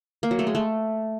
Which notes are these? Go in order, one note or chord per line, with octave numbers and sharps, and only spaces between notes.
A#3
F#3
A3
G#3
A3